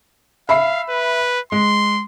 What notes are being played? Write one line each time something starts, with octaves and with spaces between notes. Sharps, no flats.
E5 F5 B5 C7
B4
G#3 C6